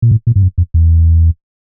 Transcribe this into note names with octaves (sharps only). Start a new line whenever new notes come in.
A#2
A2
A#2
G2
F#2
F2
E2